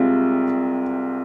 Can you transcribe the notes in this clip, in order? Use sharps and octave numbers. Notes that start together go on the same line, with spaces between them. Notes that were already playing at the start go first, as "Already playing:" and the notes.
Already playing: C2 C3 G#3 C4 F4